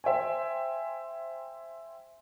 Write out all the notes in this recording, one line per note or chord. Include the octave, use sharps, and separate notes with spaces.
C5 E5 G5 G#5